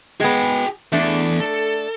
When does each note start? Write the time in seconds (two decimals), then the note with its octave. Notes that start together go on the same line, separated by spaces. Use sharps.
0.20 G#3 B3 G#4 G5
0.92 E2 A3 D4
1.40 A4